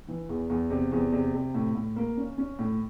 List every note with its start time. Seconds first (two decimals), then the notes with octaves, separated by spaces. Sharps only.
0.08 E3
0.29 E2
0.50 E2
0.70 C3
0.92 E2
1.12 C3
1.34 C3
1.54 A2
1.75 A2
1.96 A#3
2.17 C#4
2.38 C#4
2.59 A2